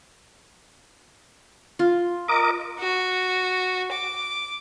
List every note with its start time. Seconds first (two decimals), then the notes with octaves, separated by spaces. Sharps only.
1.79 F4
2.28 A#4 D#5 A#5 D6
2.79 F#4
3.92 D6